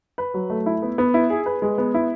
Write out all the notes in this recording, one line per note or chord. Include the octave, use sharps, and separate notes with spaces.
B4
F#3
A3
E4
B3
B3
E4
G#4
B4
G#3
B3
E4